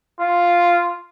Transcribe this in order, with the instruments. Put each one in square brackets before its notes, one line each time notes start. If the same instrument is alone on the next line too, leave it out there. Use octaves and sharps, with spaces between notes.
[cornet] F4